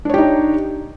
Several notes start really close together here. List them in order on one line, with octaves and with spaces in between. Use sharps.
D4 C#5 G4 D#4